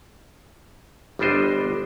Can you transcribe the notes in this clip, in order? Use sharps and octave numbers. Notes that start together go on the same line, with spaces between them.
G1 G3 B3 D4 C5 D#5